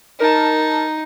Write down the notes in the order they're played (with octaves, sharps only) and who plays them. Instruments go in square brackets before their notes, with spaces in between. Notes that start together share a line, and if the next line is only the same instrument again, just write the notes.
[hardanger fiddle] D#4 [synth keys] A#4 A5